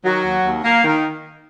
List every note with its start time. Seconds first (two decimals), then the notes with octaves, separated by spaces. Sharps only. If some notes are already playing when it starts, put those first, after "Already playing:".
0.02 D#3 F#3 F#4
0.23 D#2
0.43 D#2
0.63 A#3
0.83 D#3